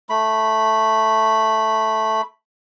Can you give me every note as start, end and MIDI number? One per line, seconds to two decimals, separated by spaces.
0.09 2.22 57
0.09 2.22 83